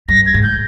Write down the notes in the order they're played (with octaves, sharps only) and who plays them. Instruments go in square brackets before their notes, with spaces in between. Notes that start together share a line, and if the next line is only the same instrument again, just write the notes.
[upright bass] G2 [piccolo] A#6
[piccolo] G#6
[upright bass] G#2
[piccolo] G6